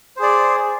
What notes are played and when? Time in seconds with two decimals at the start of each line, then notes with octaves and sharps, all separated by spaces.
0.16 C5
0.19 G#4
0.22 D5